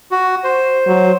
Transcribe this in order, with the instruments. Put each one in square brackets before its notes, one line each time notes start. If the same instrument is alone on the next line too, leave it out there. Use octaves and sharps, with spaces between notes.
[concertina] F#4
C5
[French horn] F#3